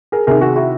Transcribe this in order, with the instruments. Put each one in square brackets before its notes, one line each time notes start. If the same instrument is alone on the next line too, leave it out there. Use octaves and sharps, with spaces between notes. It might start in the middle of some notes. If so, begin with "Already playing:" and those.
[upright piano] G#4 A#4
C3 D#3 G#4 A#4
F#4 G#4
E4 F#4